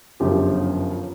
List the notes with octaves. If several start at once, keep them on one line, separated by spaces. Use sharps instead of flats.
G1 F#2 C#3 F3 G4